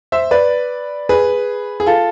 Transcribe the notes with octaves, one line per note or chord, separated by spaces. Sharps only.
C5 E5
B4 D5
G#4 B4
G#4
F4 A4